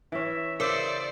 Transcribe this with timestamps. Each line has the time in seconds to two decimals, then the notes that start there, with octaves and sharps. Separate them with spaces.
0.12 E3 C#4 E5
0.60 C#3 A#4 C5 D5 D6 E6